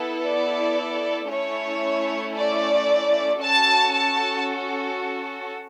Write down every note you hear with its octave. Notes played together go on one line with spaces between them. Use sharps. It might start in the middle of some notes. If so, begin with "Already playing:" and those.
Already playing: B3 E4 A4
D5
A3 C#4 E4 C#5
D5
C#4 F#4 A4 A5
A5